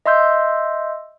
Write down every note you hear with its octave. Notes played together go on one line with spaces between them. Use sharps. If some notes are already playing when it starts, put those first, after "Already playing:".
D#5 E5 C6 E6 G6